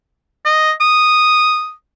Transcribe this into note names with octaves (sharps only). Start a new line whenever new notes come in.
D#5
D#6